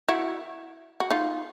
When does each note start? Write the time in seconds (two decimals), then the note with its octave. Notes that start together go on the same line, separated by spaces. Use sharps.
0.08 E4 F#4
1.00 F#4
1.10 D#4 F4